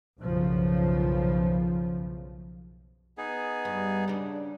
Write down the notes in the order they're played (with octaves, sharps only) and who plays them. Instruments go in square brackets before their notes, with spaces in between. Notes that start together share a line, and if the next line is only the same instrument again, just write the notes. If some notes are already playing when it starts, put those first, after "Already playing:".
[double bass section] B1 F#2 C#3 F3
[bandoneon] B3 D#4 G#4
[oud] G2
C#3 D4